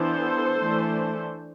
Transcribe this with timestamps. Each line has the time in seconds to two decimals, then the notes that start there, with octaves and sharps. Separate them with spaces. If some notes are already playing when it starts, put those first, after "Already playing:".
Already playing: E3 B3 D4 A4 C5
0.56 E3 A3 D4